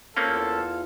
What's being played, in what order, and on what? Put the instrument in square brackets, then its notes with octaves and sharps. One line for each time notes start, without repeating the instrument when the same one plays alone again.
[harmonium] E2 F4 F5 [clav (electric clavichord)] A#3 C4 C#4 [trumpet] A4